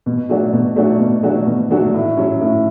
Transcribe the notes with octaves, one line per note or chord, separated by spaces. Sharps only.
B2
F#3 A3 D4 F#4
B2
F#3 A3 D4 F#4
B2
F#3 A3 D4 F#4
B2
F#3 A3 D4 F#4
A2
F#3 C#4
A2